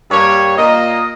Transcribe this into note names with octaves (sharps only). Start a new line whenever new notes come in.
G2 G3 A#3 C#5
A#2 A#3 D#5